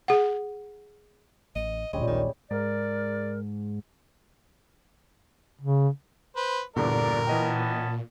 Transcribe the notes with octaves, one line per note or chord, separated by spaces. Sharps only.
G#4 F#5
A1 D#5
F1 D2 A#2 G3 G#3 C#4 D#5
A#1 D#2 D#3
G#2 A#4 D5
C#3
B4 C5
E2 G2 A#2 D3 A#4 D5
E3 B3 C#4 D#5 G5 A5